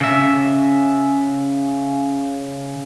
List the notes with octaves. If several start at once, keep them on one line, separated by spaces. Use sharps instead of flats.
C#3 E5